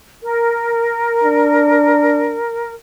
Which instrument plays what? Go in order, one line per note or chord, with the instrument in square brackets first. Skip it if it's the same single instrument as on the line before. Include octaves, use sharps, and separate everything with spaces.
[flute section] A#4
[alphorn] D4